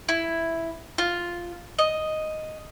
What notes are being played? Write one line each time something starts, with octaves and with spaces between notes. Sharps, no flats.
E4
F4
D#5